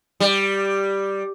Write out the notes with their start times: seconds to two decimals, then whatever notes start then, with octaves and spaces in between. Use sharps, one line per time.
0.20 G3